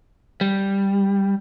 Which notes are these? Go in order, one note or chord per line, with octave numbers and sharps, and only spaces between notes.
G3